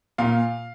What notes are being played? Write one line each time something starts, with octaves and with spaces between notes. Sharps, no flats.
A#2 F5